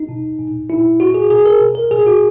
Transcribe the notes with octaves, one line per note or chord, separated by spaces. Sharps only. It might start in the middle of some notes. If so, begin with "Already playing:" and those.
Already playing: D#4
B2
A#2
A#2 E4
A#2 F#4
G#4
B2 G#4
A#4
B2
A#4
A#2 G#4
F#4